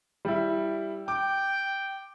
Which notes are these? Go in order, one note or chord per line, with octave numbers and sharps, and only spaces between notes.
G3 E4
G5 D6